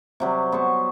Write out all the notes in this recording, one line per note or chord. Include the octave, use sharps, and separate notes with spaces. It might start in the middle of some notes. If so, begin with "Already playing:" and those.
C3 F#3 G3
B3 C5 C#6